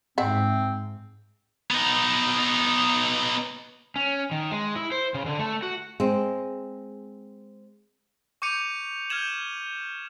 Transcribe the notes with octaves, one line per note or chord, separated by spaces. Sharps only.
G#2 C4 E5 F#5
B3 D#4
C#4
D#3
G#3
E4
C5
C#3
D3
A3
F#4
G#3 C4
C#6 D6 G6 C#7 D#7 F7
F6 G6 G#6 E7 F#7